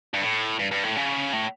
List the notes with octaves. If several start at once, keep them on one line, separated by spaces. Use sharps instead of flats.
G2
A2
G2
G2
A2
C#3
A2